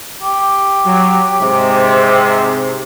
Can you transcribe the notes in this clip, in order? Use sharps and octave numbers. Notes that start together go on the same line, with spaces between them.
G4
F#3
G#2 C3